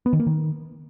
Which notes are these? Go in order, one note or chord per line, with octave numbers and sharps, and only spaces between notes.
B3
D#3
A#3
D#3